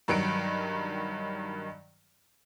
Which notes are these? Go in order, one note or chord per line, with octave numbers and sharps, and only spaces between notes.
G2 D#3 F#3 C#7 D7